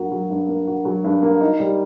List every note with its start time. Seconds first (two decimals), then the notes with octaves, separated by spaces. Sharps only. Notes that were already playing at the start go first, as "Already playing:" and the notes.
Already playing: G2 F#3 A#3 F#4
0.12 F#3
0.30 G2
0.49 A#3
0.67 F#4
0.85 F#3
1.04 G2
1.23 A#3
1.41 D#4
1.60 G3